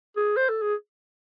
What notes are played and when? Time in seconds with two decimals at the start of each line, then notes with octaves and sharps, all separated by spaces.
0.16 G#4
0.37 C5
0.49 A4
0.62 G#4